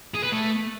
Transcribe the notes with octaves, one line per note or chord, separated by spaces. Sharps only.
G#4
B4
A3